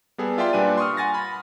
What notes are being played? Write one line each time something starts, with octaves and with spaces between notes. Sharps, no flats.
G3 B3 G#4 A4
F4 D5 E5 G5 C6
A#2 G3 D4 B4 G#5 D#7
C6 C#6 D#6 F6
F#5 G#5 A6 A#6
B5